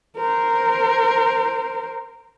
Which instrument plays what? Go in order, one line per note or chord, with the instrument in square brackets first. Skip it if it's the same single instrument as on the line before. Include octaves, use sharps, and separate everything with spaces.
[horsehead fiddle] A#4 C5